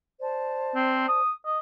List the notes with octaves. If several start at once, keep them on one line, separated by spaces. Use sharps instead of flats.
C5 D5 A5
C4
D#6
D#5